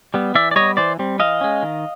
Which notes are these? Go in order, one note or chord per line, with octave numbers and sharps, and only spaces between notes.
G3 B3
E3 D5 E5
D5
G3 B3 C#5 D#5
E3 C5 D5
G3 C4
E3 D#5 F5
G#3 C#4
D#3